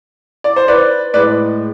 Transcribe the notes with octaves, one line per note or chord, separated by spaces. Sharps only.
D5
C5
B4 D5
A2 G#3 B4 D5